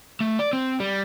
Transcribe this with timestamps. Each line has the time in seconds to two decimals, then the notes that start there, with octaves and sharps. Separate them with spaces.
0.20 A3
0.39 D5
0.53 C4
0.80 G3